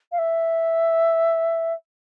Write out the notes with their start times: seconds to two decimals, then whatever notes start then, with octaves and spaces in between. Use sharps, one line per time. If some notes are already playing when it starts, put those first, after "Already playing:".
0.12 F5
0.18 E5